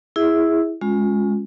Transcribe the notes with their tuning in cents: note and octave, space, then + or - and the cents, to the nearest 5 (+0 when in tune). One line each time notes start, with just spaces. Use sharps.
E4 +0 G#4 -5 E5 -20
G#3 +0 C#4 +0 F4 +35